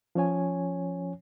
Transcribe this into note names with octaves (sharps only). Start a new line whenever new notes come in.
F3 C#4 C#5 G#5